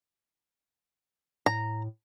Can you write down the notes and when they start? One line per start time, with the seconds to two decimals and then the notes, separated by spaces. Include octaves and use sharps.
1.46 A2 A#5